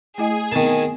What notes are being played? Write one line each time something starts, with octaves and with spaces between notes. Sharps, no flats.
A3 E4 G#4 D#5
D#3 B3 C4 A#4 A5